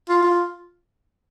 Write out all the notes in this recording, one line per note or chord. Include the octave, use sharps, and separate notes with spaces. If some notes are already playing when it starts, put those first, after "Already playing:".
F4
F4